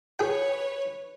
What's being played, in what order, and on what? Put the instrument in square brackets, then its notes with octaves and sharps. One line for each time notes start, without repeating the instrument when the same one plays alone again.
[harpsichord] G#4 G5 [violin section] B4 C#5